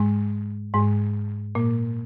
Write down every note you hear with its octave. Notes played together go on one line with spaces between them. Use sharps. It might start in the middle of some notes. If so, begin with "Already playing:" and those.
Already playing: G#2 G#3
G#2 G#3
A#2 A#3